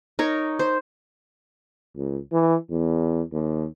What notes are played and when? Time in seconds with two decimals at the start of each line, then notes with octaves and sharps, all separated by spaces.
0.19 D#4 A#4 C#5
0.59 C5
1.96 C#2
2.32 E3
2.70 E2
3.32 D#2